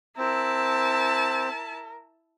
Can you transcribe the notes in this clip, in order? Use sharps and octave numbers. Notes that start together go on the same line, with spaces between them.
C4 E4 A#4 A5